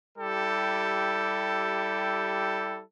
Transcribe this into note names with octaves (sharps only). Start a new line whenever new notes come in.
G3 E4 G4 A4